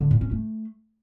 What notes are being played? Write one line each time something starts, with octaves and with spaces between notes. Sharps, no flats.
D3
A#2
C#4
A3